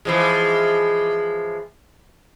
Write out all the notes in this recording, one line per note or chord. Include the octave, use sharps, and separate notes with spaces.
E3 F3 G#3